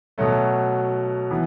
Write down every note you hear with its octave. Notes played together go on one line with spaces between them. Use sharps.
B2 F#3 A3
E3 B3